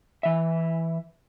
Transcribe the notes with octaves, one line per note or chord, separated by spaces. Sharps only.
E3 E5